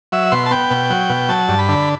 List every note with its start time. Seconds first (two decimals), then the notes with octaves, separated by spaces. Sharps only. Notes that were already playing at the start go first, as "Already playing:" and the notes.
0.12 F#3 E5
0.32 B2 C6
0.46 A5
0.51 B3 G5
0.71 B2
0.90 F#3
1.10 B2
1.29 F#3 A5
1.49 G2
1.59 B5
1.69 D3